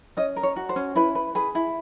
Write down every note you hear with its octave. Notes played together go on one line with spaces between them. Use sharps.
C#4 D#5
A#4
C#5
F#4
C5
C#4
E4 B4
B4
G#4 B4
E4